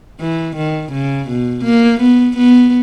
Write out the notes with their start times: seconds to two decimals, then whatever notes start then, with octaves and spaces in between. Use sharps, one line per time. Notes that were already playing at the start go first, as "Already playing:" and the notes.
0.20 E3
0.56 D#3
0.92 C#3
1.28 B2
1.64 A#3
2.01 B3
2.37 B3